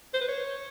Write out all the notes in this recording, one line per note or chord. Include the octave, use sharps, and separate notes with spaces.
C5
B4
C#5